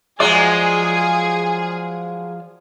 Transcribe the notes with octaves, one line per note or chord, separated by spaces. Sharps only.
F3 F#3 G#3 G#4 D5 D6